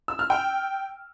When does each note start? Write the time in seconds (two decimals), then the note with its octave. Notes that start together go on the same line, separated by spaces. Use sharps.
0.08 E6
0.19 F6
0.30 G5